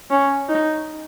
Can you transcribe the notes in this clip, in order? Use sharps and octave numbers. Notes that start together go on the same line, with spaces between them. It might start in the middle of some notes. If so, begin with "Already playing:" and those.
C#4
D#4